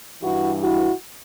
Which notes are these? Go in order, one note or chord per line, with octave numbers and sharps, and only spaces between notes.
G2 E3 E4 F#4
E4 F#4